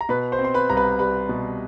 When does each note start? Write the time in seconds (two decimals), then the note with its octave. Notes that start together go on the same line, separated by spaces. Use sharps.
0.01 A#5
0.09 B2 B4 B5
0.32 C5 C6
0.39 C4
0.44 C6
0.54 B4 B5
0.70 C2 A#5
0.77 B4 B5
0.99 G3 B4 B5
1.29 B2